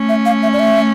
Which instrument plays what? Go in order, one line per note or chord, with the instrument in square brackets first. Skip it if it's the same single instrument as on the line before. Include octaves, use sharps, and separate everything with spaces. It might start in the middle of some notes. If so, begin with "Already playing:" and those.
Already playing: [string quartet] A3 C#4
[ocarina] E5
F5
E5
D5
E5